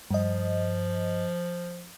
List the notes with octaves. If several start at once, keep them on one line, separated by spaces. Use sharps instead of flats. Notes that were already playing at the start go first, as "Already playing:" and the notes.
G2 F3 D#5